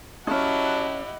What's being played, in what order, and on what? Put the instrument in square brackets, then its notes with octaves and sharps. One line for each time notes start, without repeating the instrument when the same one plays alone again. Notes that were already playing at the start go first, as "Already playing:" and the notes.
[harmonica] F#3 A5 [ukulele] C#4 D#4 [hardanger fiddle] E4 G4 [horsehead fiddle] D#5 F#5